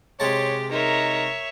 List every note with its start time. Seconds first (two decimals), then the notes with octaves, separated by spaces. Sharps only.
0.20 C3 G#3 G4 C#5 A5
0.71 D#4 A#4 C#5 E5 A#5